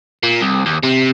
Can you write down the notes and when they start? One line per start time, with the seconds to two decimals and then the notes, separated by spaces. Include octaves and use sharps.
0.23 A#2
0.41 C2
0.66 D#2
0.83 C3